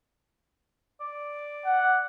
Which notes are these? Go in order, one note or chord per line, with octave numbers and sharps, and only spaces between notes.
D5
F#5